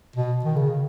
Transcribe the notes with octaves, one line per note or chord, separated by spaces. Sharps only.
B2
D#3
C#3